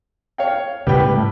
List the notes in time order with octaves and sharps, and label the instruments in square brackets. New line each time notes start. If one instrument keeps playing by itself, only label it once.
[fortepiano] C#5 F5 G5
[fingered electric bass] G#2 C#3 [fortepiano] G3 B4 G5
[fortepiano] A2